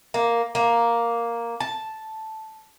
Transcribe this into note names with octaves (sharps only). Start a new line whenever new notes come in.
A#3
A#3
A5